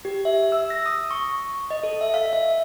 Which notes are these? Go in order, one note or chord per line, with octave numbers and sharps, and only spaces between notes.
G4
E5
E6
A#6
D#6
C#6
D#5
A4
E5
F5
E5